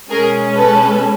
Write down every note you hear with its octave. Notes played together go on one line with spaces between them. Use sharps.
B2 G#3 C#4 G#4 A#4
A4 B4